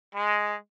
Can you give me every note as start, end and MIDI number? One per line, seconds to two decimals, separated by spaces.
0.14 0.55 56